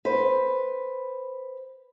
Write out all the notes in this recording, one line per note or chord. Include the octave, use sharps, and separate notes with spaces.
B4 C5